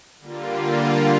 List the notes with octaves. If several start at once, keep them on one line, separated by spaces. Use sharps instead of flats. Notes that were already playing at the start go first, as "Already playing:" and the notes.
D3 G3 A#3 F4